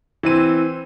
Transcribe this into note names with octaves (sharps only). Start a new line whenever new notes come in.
E3 C4 D#7